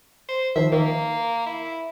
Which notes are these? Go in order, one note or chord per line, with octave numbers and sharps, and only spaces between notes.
C5
D#3 F3 E5
D#3 A#3
E4